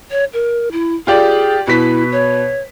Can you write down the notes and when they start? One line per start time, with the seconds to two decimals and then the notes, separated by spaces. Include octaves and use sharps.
0.11 C#5
0.33 A#4
0.72 E4
1.07 F4 G4 G#4 D5
1.67 B2 E4 B4 B6
2.12 C#5